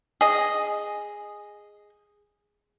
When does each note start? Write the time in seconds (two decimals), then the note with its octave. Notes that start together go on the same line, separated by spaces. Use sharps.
0.21 G#4 D#5